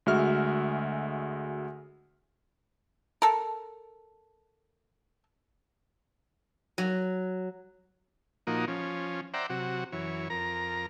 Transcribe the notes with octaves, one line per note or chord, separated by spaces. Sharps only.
D2 G#3 F#4 E5 F6
A4 A#4
F#3
A#2 F3 A#3 D#4 F#4
F3 C#4
C5 D5 E5 F#5 G5 A#5
C3 F#3 F#4
F#2 E3 C#5
F2 A#4 A#5